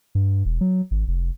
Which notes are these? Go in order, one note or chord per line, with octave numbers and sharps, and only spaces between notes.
G2
E1
F#3
G#1
F1